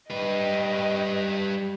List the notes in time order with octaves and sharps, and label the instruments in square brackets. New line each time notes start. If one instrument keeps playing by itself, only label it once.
[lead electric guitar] G3 B4 [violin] D#5 G5